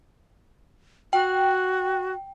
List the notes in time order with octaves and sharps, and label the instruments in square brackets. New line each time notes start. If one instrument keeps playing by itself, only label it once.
[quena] F#4 [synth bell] G5